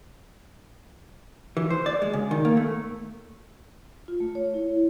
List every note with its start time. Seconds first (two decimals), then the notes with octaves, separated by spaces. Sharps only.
1.57 E3
1.70 C5
1.86 D5
2.02 G#3
2.13 C#3
2.31 D#3
2.45 A#3
2.57 A3
4.08 F4
4.20 A3
4.35 C#5
4.54 E4
4.69 C#5